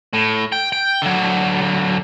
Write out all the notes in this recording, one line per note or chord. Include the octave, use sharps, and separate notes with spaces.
A2
G5
G5
D3 F#3